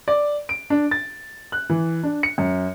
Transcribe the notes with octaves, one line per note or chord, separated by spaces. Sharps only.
D5
D7
D4
A6
F#6
E3
D4
C#7
F#2